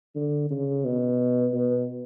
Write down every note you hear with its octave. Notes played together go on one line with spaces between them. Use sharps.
D3
C#3
B2
B2